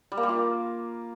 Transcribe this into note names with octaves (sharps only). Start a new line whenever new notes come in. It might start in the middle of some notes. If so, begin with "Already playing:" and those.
G3
A#3
G3
F4